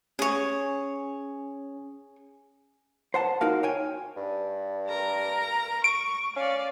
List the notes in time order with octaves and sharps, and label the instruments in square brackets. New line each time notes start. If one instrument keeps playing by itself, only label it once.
[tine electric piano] C#4 [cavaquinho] G#4 C#5
[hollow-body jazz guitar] C5 F#5 A5
D#4 F#4 A#4 F5
C#5 G5 G#5
[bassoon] G2
[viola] A#4 A#5
[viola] C#6 [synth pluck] D7
[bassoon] C#4 [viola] D5 F5